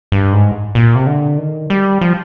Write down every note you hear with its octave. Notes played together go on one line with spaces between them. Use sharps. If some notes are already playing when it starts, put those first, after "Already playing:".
G2
G#2
A#2
C3
D3
D#3
G3
F3